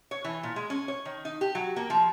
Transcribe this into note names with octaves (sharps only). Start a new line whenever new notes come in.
C#5
E3
A#2
G#3
C#4
C#5
D#3
D#4
G4
F#3
A#3
F3